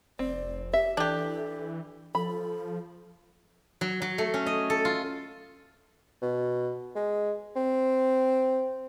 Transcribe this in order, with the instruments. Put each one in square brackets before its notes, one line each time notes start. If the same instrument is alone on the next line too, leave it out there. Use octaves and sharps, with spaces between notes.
[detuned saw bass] F1 [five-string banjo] C4 [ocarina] D5
[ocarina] G4 [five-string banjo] E5
[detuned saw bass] E3 [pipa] D4 G4 [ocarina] A4
[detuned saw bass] F3 [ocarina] A4 [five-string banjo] B5
[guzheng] F#3
F#3
A3
C#4
D#5
A4
F4
[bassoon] B2
G#3
C4